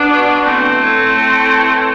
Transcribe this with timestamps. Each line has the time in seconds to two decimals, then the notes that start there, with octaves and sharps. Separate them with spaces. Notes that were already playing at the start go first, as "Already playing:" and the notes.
Already playing: B3 D4
0.10 B2
0.28 B2
0.45 E3 A3 C4
0.62 E3
0.81 A2
0.98 A2
1.15 A2
1.33 A2
1.52 E3
1.69 A2